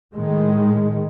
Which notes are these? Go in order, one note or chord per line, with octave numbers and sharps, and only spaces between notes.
A2 D#3 G#3